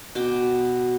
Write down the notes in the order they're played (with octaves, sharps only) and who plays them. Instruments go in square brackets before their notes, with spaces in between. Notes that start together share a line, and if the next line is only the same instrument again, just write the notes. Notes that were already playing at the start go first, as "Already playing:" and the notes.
[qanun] B2 G5 D6